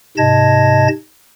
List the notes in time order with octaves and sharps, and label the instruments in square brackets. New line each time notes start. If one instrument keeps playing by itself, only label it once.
[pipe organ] G#2 C3 D#5 A5 G#6 A#6